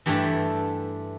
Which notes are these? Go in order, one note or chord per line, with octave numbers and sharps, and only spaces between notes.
G2 E3 A3 D4 G4